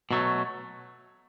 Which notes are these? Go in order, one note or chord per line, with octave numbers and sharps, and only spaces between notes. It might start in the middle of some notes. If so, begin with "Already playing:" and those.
B2 F#3 A3